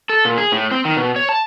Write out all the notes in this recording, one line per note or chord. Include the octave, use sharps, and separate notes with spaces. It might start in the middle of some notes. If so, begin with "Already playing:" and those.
A4
A#2
G#4
A2
C4
D#3
B2
C#5
A5